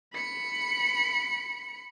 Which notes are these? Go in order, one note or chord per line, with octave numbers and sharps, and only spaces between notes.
B5 C#7